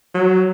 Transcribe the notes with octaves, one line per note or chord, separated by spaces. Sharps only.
F#3